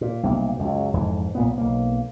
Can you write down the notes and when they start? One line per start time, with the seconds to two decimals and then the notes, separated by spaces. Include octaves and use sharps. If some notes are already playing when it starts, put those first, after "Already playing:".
0.01 A#2
0.23 B1 C3 G3 A#3
0.57 C#2 F#2
0.93 F1 F2 G#2 E3
1.35 B1 A#2 B3
1.58 B1 A#3